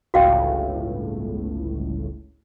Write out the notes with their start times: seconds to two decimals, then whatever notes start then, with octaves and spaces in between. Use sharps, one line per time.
0.14 G1 C#2 A2 F#4 F5 G5